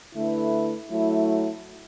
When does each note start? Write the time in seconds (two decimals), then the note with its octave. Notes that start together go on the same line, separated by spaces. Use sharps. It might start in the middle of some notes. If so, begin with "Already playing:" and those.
0.14 D3 A3 E4 B4
0.90 F#3 A3 E4